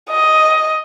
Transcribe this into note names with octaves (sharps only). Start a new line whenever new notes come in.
D#5